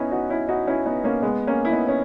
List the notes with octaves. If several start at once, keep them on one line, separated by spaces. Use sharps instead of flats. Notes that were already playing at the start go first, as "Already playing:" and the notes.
Already playing: B3 C#4 D#4 E4
D#4 F#4
C#4 E4
D#4 F#4
C#4 E4
B3 D#4
A#3 C#4
G#3 B3
A#3 C#4
E4
B3 D#4
C#4